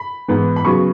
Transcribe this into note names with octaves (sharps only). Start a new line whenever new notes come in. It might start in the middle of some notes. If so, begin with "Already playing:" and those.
Already playing: B5
G#2 E3 B3
B5
C#3 F#3 B3 C#6